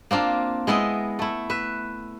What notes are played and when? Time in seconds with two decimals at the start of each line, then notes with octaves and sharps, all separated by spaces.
0.11 A#3 C4 D4 F4
0.67 G#3 B3 E4 D#5
1.19 A3 E4
1.50 B4 E5